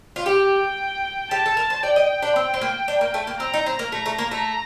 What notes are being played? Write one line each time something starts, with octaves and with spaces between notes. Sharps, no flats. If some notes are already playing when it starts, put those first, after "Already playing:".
F4
G4 G5
G4 A5
A4
A#4
C5
D5 G5
D#5
D4
C4
C4
A#3
D4
A#3
A3
A#3
C4 A#5
D#4
C4
A#3
A3 A#5
A3
A#3
A3